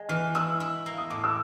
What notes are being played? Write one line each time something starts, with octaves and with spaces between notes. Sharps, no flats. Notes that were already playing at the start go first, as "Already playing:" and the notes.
Already playing: G#3
E3 F6
E4 E6
E4
A#3
D#6
A2 D6
E6